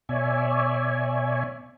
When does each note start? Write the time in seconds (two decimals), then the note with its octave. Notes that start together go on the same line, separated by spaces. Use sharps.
0.09 B2 C#5 D5 E5 G#5